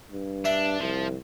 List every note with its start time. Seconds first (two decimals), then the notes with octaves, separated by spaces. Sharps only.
0.12 G2
0.45 D4 E5
0.80 C2 F3